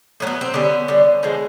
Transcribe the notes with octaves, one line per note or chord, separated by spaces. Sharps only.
A2 F#3 A3
B3
C4
D3 G3 B3 C#4
D3 G3
D3 F3 G#3